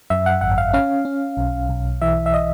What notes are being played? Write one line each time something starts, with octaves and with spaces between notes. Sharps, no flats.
F#2 E5
F#5
G#1 F#5
F5
C#4 F5
C#4
B1
B1
E3 E5
E5
D#5